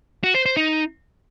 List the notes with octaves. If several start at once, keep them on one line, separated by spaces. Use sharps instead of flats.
F#4
C5
C5
D#4